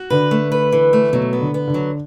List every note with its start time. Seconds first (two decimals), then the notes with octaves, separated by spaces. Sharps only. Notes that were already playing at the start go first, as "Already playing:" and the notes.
Already playing: F#4
0.10 D3 B4
0.31 A3
0.52 B4
0.72 E3
0.93 A3
1.13 B2 F#3
1.33 B3
1.41 D3
1.54 B3
1.68 D3
1.74 F#3